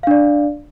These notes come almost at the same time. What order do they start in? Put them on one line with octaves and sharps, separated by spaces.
F5 D4 D5